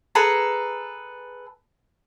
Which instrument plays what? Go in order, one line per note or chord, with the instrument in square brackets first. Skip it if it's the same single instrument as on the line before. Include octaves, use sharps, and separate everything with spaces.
[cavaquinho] G#4 A4 B4 A#5